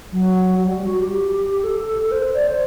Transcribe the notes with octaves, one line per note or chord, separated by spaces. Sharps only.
F#3
F#3
G3
F#4
G4
A4
C5
D5
C5